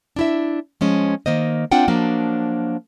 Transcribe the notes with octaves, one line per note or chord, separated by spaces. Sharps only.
D4 E4 E5
F3 G#3 C#4
D#3 A#3 C5 D#5
C4 D4 F4 F#5 G5
F3 F#3 A#3 D4